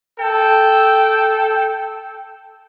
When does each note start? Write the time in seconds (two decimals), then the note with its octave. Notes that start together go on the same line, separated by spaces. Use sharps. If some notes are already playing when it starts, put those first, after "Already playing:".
0.20 A4 G5